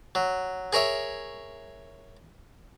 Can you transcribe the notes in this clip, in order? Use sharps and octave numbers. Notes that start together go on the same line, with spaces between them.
F#3
G#4 A#4 C#5 E5